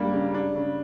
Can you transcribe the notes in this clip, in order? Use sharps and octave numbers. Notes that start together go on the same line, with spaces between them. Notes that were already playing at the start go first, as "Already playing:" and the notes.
Already playing: G3 A#3 D4
C#3
D4
C#3